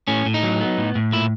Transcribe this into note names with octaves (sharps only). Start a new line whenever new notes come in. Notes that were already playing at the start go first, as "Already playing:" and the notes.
A2 C#4
A2
D#4
F#3
B3
A2
A2
A#2 E4